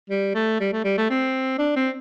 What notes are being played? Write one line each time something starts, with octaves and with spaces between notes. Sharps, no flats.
G3
A3
G3
A3
G3
A3
C4
D4
C4